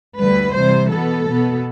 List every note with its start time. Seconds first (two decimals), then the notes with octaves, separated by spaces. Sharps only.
0.19 D2 D3 G3 B4
0.54 C3 E3 G3 C5
0.91 B2 B3 A4
1.27 B2 B3